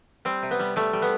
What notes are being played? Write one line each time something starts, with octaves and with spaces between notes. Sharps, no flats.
G3 C4
C3
B3
G3
G3 A3
G3
B3